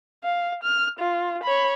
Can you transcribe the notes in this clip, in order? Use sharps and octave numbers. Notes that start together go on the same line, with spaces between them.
F5
F6
F4
C#5 B5